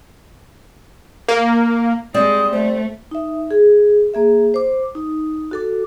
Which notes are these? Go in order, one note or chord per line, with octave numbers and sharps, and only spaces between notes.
A#3
G3 G#3 C4 D5 D#6
A3 C5
D#4 E5
G#4
A#3 G#4 E5
C5 D6
D#4
F#4 A4 D6